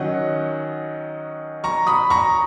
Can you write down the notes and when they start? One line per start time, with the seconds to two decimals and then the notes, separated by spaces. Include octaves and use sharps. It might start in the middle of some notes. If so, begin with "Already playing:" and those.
Already playing: D#3 F#3 C#4 D#5 F#5
1.64 A#5 C#6
1.87 B5 D#6
2.10 A#5 C#6